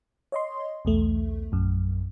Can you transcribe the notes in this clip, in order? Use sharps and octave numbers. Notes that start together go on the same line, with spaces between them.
C#5 D#5 C6
B1 E2 A3
A#1 F#2